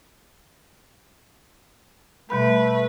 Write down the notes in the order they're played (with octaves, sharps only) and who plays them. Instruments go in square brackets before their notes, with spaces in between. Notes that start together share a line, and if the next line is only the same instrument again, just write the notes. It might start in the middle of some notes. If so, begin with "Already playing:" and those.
[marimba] B2 G3 B5 [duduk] A3 [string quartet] B4